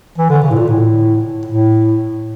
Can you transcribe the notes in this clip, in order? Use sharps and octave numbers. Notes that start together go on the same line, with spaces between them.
E3
D3
C#3
A2
A#2
A2
A2